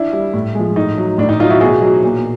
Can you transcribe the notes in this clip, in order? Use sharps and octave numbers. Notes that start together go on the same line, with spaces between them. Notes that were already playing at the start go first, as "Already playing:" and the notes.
Already playing: D4 E4
G3
A2
F3 G#3
A2 D#4
F#3
A2 D4
D#4
F#3 D#4 F4
E4 F#4
B2 F#4 G#4
F#3
A#2